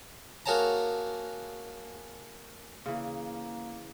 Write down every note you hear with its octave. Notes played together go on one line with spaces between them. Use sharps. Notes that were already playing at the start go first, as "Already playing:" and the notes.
A#3 F#4 G#4 C#5 A5 A#5
C#3 E3 A#3